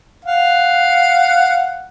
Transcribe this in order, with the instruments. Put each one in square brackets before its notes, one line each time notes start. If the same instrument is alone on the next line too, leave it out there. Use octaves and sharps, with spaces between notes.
[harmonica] F5 F#5